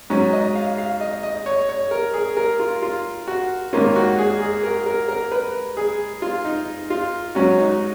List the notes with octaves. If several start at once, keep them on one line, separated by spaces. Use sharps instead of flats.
G#2 F#3 C#4
D#5
F5
F5
D#5
D#5
C#5
C#5
A#4
G#4
A#4
F4
F4
F#4
G#2 D#3 A#3 C#4 F4
F#4
G#4
G#4
A#4
A#4
A#4
B4
G#4
F4
D#4
F4
G#2 F#3 C#4 F#4
D#4